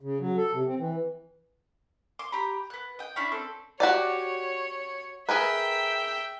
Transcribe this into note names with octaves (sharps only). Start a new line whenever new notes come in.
C#3
F#3
A4
C3
C4
E3
C6 D6
G4 A#5 B5
B3 F#6
D#5 G5
C#4 D4 E4 D5
C4 A4
F#4 G4 C#5 D5
G#4 A#4 B4 E5 G5